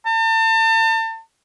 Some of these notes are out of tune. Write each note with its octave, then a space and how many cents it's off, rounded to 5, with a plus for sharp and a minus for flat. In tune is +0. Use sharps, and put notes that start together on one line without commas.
A5 +35